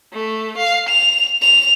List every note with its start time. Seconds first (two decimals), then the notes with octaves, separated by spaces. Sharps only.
0.13 A3
0.57 F5
0.89 F7
1.42 F7